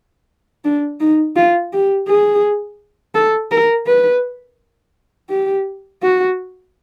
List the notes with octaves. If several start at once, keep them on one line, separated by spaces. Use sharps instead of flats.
D4
D#4
F4
G4
G#4
A4
A#4
B4
G4
F#4